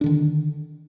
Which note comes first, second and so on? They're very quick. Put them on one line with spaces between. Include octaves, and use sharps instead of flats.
D4 D3 D#3